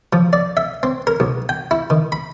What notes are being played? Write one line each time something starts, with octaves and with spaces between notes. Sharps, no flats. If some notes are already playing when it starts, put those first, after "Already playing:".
F3
D5
E5
C4
A#4
B1
G5
E4
D#3
B5